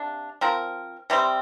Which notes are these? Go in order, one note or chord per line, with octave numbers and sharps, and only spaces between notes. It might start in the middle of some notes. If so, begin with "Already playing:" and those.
Already playing: C3 A#3 D4
F3 C4 A#4
C3 G3 C4